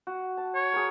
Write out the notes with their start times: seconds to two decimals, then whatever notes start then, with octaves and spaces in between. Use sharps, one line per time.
0.07 F#4
0.37 A5
0.54 C#5
0.73 G#4 A#4